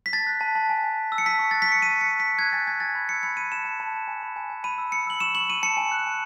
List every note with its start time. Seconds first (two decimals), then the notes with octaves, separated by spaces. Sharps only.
0.06 B6
0.13 A5 A6
0.27 F#6
0.41 A5
0.55 A5
0.69 G#5
0.84 G#5
0.97 G#5
1.12 E6
1.18 C#7
1.26 A5 B6
1.39 C#6
1.51 F#6 A6
1.62 B6
1.68 C#6 C#7
1.82 A5 D#7
1.96 F#6 C#7
2.11 A5
2.20 B6
2.25 A5
2.38 F#6 G#6
2.53 G#5 A6
2.66 G#5 G#6
2.80 G#5 A6
2.95 B5
3.09 E6 C#7
3.23 B5 C#7
3.37 B5 D#7
3.52 A5 E7
3.65 A5
3.80 A5
3.94 A5
4.08 G#5
4.22 B5
4.36 G#5
4.50 G#5
4.64 B5 D#7
4.78 E6
4.92 B5 C#7
5.07 E6 F#7
5.20 C#6 E7
5.35 C#6 F#7
5.50 C#6 D#7
5.63 A5 C#7
5.77 G#5
5.92 F#6
6.06 G#5